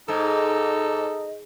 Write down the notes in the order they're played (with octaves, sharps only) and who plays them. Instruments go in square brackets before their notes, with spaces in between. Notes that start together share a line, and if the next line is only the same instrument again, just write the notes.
[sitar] G#2 [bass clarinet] D#4 [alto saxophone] A4 [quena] D#5